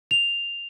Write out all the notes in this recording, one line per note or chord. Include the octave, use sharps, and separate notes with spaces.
F7